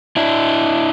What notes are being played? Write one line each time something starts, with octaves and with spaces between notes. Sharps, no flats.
D4 E4